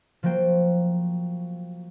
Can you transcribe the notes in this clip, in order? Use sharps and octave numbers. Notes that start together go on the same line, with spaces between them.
F3 F#3 A#3 C5 G5